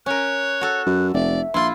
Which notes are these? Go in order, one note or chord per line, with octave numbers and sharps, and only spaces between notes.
C#4 A#4 C#5 F#6
F#4 A4
F#2
F1 D5 E5
A#1 E4 F4 C6